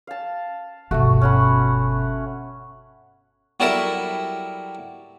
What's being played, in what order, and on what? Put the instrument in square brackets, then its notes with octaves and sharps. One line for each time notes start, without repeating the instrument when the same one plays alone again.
[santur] F5 A5
[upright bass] G1 B2 [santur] A3 F#4
[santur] C#4 F#5 B5
[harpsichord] F#3 G3 E4 A4 A#4 E5